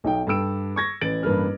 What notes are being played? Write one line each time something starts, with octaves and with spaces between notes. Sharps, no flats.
B1 D#4 G5
G2 A4 G5 E6 D7
C#6 G#6 A#6
A1 B4 A6 D7 F#7
A1 G2 A#3 B4 F6